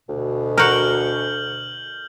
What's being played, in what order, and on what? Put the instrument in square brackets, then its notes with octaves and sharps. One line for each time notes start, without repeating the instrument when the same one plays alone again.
[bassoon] D2 [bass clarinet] B2
[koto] F#4 A#4 [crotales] F6 G6 F#7